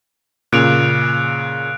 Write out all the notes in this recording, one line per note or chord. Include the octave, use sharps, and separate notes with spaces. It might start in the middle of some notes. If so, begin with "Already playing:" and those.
A#2 C#3 F#6 D7 F7